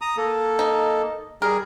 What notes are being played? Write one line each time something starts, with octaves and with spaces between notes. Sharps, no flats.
A#5 D#6
A#3 A4
D#4
G3 G#4 A#4